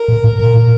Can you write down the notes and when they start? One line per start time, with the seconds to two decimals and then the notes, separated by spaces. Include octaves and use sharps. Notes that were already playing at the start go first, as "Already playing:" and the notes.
Already playing: A#4
0.08 A#2
0.24 A2
0.38 A#2 A#4